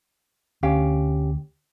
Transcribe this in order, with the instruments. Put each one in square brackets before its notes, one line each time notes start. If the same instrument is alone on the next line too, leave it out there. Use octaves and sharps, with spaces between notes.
[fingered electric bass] D2 [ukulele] C#4 G4 F5